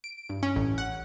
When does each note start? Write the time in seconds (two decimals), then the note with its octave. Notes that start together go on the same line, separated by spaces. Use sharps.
0.04 D7
0.29 G2
0.43 C#4
0.56 A1
0.78 F#5